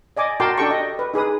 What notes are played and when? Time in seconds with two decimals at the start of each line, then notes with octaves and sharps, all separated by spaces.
0.17 D5 D#5 G#5 D6
0.40 F#4 A#4 G5 A5 C6 D6
0.58 D4 G4 A4 G5 A5 C#6
0.71 D#5
0.99 B4
1.14 D#4 G#4 B4 D#6